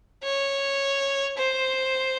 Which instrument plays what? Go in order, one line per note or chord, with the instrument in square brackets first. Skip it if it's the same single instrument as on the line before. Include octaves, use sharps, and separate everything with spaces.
[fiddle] C#5
C5